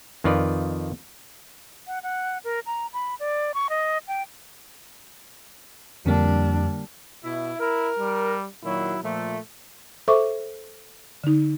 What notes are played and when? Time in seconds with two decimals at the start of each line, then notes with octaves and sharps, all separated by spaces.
0.24 F2 D#3 F4 B4 D5
1.87 F#5
2.03 F#5
2.44 A#4
2.66 A#5
2.93 B5
3.20 D5
3.54 C#6
3.70 D#5
4.08 G5
6.06 F2 D3 G3 A#3 D4
7.24 B2 E4
7.60 E4 A#4
7.99 G3
8.64 A#2 D#3 F#3 E4
9.03 A#2 F3 A3
10.08 A4 C5 E5 C#6 D6
11.24 D3 D#4